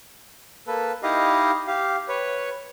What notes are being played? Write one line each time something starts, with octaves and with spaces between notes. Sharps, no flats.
A#3 A4 B4
D#4 E4 G4 D#5 F5
G4 F5
B4 C#5